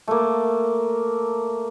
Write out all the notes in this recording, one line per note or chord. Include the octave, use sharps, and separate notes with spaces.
A3 A#3